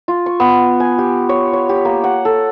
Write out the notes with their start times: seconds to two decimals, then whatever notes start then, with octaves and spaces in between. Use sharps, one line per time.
0.08 F4
0.26 C#6
0.40 B3
0.80 G#5
0.98 G4
1.29 C#5
1.53 C#5
1.69 G4
1.85 A#3
2.04 F#5
2.25 A4